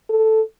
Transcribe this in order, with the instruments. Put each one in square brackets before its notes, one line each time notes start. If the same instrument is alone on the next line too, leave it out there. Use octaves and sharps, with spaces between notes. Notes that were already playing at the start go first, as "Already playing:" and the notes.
[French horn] A4